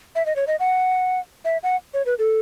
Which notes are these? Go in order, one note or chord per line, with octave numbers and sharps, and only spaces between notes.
E5
D#5
C#5
D#5
F#5
E5
F#5
C#5
B4
A4